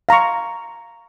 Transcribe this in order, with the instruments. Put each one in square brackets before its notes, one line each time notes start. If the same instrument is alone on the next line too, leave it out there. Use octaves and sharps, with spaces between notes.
[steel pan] F5 A#5 C6 C#6